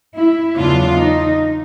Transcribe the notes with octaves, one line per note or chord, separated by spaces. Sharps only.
E4
E2 C#3 F#3 B3 D4 F4
D#4